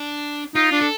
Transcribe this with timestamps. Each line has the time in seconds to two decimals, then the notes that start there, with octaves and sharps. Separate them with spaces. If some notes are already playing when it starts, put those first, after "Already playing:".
Already playing: D4
0.55 D#4 F4
0.72 D4
0.81 A4